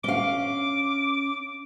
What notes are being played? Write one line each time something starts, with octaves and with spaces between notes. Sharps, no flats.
C#4 F5 D6